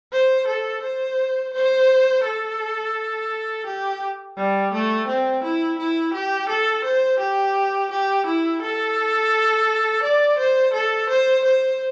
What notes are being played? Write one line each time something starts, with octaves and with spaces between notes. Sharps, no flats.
C5
A4
C5
C5
A4
G4
G3
A3
C4
E4
E4
G4
A4
C5
G4
G4
E4
A4
D5
C5
A4
C5
C5